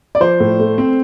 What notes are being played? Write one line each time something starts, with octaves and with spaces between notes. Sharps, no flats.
D5
F3 C5
A2
A3
C4